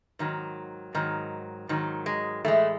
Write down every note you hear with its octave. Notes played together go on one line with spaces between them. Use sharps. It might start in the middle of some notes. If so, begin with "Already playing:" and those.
G#2 D#3 F#3
G#2 D#3 F#3
G#2 D#3 F#3
G#3
A2 E3 G#3 A3